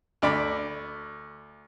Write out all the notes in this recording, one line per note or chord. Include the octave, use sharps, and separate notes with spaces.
D2 D5 B5